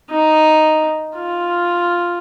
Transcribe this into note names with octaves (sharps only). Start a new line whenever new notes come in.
D#4
F4